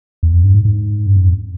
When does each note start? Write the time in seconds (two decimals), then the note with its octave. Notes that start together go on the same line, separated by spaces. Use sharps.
0.23 E2
0.33 F2
0.44 G2
0.54 G#2
0.65 G#2
1.06 G2
1.17 F#2
1.27 F2